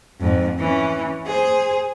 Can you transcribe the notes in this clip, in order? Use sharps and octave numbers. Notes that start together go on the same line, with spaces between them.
F2 G#2
E3 C#4
G#4 C5